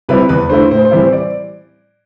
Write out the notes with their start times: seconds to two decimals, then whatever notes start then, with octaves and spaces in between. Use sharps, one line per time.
0.09 C3 G3 C4 E4 B4
0.29 E2 B4
0.50 D3 A3 E4 C5
0.71 A2 C5
0.85 C5
0.91 E3 G3 C4 E4
0.99 C5
1.13 D5